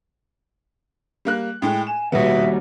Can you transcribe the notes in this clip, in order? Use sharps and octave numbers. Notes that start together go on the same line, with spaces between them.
G3 A#3 F#6
A2 G#3 G5
G#5 E7
D#2 B2 G3 B3 F#4 E5